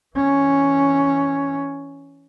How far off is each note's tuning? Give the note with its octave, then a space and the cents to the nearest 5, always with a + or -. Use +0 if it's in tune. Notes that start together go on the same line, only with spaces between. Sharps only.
E3 +0 C#4 +0